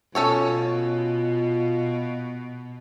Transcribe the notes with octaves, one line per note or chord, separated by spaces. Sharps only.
B2 C#4 F4 A4 C#5